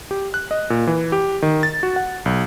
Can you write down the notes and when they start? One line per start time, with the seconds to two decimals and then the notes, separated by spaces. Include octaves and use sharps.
0.11 G4
0.34 F#6
0.51 D#5
0.70 A#2
0.87 E3
1.12 G4
1.42 D#3
1.63 A6
1.83 F#4
1.96 F#5
2.26 B1